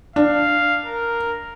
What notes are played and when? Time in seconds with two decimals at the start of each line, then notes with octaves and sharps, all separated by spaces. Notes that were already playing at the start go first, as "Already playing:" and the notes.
0.16 D4 F5
0.85 A#4